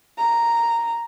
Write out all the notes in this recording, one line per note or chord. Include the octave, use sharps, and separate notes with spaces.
A#5